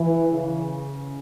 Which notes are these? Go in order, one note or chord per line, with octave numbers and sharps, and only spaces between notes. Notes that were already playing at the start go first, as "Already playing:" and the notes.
Already playing: E3
C#3